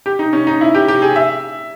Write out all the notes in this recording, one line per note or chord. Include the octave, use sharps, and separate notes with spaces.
G4
D#4
C#4
D#4
E4
G4
G4
G#4
E5